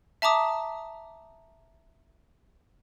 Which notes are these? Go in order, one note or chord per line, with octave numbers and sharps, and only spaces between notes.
E5 A5 A#5 D6 D#6